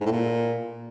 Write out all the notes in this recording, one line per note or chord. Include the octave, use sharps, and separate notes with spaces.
G#2
A2
A#2